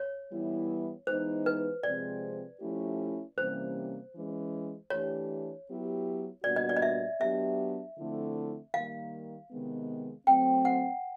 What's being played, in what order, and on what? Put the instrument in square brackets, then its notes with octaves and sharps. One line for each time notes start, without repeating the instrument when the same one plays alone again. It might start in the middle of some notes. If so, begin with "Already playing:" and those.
Already playing: [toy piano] C#5
[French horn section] E3 G3 B3 E4
[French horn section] E3 G#3 B3 D#4 [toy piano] C5
[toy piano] B4
[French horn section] C3 F3 G#3 C4 [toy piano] D5
[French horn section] F3 A3 C#4 E4 G4
[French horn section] C3 E3 G3 A#3 C#4 [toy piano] C5
[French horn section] E3 G#3 C#4
[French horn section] E3 A3 D4 G4 [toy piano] C#5
[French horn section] F#3 B3 E4 G4
[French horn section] A#2 G3 B3 D4 F#4 [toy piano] D5
[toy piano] D#5
D5
D#5
E5
[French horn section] F#3 B3 D4 G4 [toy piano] E5
[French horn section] D3 F3 A3 C4 E4
[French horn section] D#3 G3 A#3 [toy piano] F5
[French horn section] C3 D#3 G#3 B3
[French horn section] F#3 A3 C4 [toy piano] G5
[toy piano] F#5